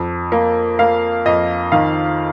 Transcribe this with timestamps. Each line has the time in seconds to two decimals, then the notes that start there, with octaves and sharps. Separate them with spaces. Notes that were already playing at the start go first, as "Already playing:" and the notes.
Already playing: F2
0.32 A#3
0.79 A#3 F5
1.25 F2 D#5
1.72 D#3 F5